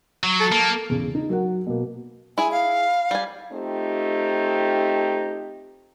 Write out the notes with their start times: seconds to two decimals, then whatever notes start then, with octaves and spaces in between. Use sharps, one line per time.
0.24 F#3
0.40 A4
0.52 A#3
0.89 E2 C#3
1.15 D#4
1.29 F#3 A#4 F#5
1.66 B2 A#3
2.38 E4 G#4 G#5
2.51 F5
3.11 G3 G#5
3.53 A3 C4 D#4 F4 G4